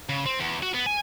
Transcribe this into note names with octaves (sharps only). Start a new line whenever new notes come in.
C#3
C4
E2
F#4
B3
G#5